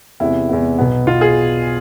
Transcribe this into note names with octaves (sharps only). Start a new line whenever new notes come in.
E2 C3 G#3 B3 E4
E2 C3 G#3 B3
B1 B2 B3
B1 B2 B3 F4
G#4